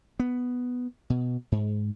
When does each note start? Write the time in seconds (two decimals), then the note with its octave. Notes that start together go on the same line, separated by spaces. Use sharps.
0.20 B3
1.10 B2
1.52 G#2